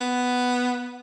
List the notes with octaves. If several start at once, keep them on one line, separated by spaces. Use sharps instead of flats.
B3